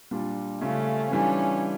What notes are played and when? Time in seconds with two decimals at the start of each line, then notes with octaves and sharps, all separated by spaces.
0.11 A#2 G3 D4 F4
0.61 C#3 G3 A3 C#4 F4
1.11 E3 G3 C#4 D4 F4